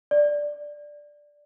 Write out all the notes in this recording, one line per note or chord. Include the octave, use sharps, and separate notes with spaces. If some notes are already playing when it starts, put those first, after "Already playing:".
D5